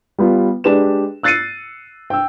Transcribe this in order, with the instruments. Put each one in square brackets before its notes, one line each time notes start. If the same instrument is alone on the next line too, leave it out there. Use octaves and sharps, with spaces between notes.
[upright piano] G3 B3 F4
G#3 D4 G4 B4 E7
E6 F#6 A6 C7 C#7 D#7
G5 E6